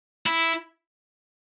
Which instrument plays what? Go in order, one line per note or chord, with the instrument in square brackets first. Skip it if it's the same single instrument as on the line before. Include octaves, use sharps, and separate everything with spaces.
[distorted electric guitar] E4